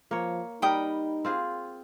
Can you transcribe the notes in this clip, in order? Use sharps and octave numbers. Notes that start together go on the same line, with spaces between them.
F3 A#3 C#5
G3 D#4 A#4 G5 B5 D#6
C4 F4 G#4